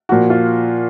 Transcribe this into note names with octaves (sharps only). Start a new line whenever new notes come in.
A#2 F3 F#4
F4